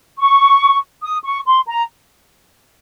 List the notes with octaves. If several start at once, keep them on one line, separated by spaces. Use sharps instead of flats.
C#6
D#6
C#6
C6
A#5